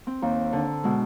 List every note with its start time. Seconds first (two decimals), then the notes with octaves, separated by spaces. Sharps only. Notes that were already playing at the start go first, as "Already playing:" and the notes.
0.07 C4
0.22 D#2
0.53 D3
0.83 B2 G#3 E6